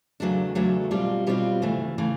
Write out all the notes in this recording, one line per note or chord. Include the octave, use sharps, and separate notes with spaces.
E2 C#3 F#3 A3 D4
E2 C#3 F#3 A3 D4
B2 G3 C4 F4
B2 G3 C4 F4
D2 C#3 E3 A3
C#3 E3 A3